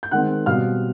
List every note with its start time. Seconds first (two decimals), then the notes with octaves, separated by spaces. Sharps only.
0.03 G6
0.11 D#3 G#3 C4 F#5 F#6
0.46 B2 G3 C4 F5 F6